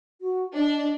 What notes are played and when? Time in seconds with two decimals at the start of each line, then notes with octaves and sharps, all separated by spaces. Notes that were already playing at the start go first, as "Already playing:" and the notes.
0.21 F#4
0.54 D4 D#5